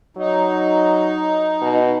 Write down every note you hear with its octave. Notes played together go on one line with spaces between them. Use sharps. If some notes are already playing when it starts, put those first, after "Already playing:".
F#3 D#4
B2